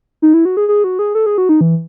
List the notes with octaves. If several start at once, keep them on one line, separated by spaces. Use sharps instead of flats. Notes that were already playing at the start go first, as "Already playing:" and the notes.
D#4
E4
F#4
G#4
G#4
F#4
G#4
A4
G#4
F#4
D#4
E3